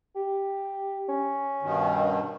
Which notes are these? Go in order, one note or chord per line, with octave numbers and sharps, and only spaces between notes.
G4
C#4
G2 B2 D#3